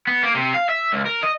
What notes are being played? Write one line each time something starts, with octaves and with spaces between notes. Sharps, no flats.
B3
A#3
C3
F5
E5
C#2
A#4
D#5